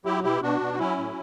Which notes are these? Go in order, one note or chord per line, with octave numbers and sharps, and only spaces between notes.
F#3 E4 G4
B2 E4 G4
B2 D4 F#4
B2
F#4
F#3 C#4 E4
A2